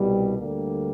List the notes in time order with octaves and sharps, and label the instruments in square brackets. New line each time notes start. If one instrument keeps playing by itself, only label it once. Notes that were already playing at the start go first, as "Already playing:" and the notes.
Already playing: [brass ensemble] C2 B2 G3
D2 D3 G3 A#3